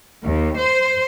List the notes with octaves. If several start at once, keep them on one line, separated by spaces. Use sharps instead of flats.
D#2
C5